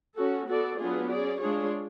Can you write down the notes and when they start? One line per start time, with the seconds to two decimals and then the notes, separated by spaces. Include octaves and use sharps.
0.15 C#4 F#4 A4
0.46 B3 F#4 A4 D5
0.78 F#3 B3 D4 F4 G#4
1.10 C#4 G#4 D5
1.42 G#3 D4 F4 G#4 C#5